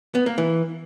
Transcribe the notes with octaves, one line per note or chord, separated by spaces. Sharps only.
B3
A#3
E3